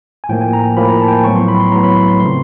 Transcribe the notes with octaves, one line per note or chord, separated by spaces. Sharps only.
G#5
A2 F3 A#3 G5
G#5
A#5
A2 F3 A#3 B5
A#5
A5
G5
G#5
A2 F#3 B3 C#6
C6
B5
C6
A2 F#3 B3 A#5
B5
C6
C6
C#3 F3 A3 C4 C6